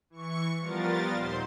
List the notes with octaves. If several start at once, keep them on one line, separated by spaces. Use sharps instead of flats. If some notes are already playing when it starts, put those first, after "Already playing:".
E3 C#6 C#7
F3 G3 B3 F4 A#4 A6
D#2 A#2 C5 C6